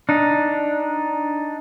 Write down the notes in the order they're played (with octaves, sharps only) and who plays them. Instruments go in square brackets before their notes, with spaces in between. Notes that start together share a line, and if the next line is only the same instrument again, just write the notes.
[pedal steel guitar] D4 D#4